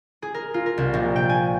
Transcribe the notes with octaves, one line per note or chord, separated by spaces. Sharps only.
G#4
A#4
F4
A#4
C2
A#1
G5
G#5